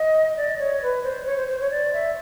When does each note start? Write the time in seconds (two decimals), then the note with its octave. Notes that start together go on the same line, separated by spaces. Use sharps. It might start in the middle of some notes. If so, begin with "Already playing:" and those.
Already playing: D#5
0.37 D5
0.58 C#5
0.82 B4
1.03 C5
1.26 C#5
1.37 C5
1.48 C5
1.60 C#5
1.70 D5
1.93 E5